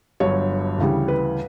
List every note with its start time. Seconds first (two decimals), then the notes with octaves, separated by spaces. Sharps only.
0.20 G1 G2 F#3 C#5
0.78 D2 C#3 E3 G3
1.08 B4